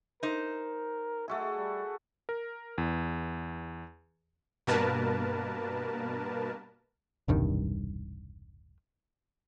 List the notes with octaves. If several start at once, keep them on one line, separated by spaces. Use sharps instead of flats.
D#4 A#4 C5
A3 F#4 G#4 E5
G3
A#4
E2
G2 B2 A#3 A#4 B4 A5
E1 C2 G2 D#3